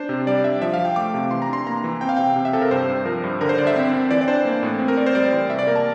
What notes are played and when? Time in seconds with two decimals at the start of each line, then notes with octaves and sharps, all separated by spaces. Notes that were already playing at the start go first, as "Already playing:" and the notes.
Already playing: D4 C5
0.09 C3
0.27 G3 D5
0.44 D4 E5
0.62 F3 E5
0.74 F5
0.79 F3
0.85 G5
0.96 A3 D6
1.14 C3
1.31 E3 C6
1.42 A#5
1.49 D4 C6
1.66 A#3 A#5
1.84 E3
2.01 C4 G5
2.09 F5
2.17 C3 G5
2.36 C3
2.45 E5
2.53 C3 A4
2.62 A#4
2.71 G2 C5
2.89 G2
3.05 F3 A#4
3.24 G2
3.41 D3 A#4
3.49 C5
3.58 D3 D5
3.67 E5
3.76 C4
3.93 C4
4.11 E3 D5
4.21 D5
4.28 D4 C5
4.45 A#3
4.63 A2
4.79 C4
4.88 A#4
4.97 C4 D5
5.06 C5
5.15 G3 D5
5.33 E3
5.49 C3 E5
5.59 D5
5.67 A#3 A#4
5.76 A5